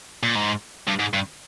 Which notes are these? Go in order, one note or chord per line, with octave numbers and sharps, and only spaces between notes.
A#2
G#2
G2
G#2
G2